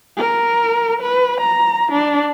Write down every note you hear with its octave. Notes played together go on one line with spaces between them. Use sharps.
A#4
B4
A#5
D4